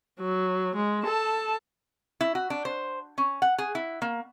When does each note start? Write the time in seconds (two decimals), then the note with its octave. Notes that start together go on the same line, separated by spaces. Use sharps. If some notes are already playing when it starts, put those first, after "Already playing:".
0.21 F#3
0.76 G#3
1.05 A4 A5
2.21 E4
2.35 F#4
2.50 D4
2.65 C5
3.18 C#4
3.42 F#5
3.58 G#4
3.75 E4
4.02 A#3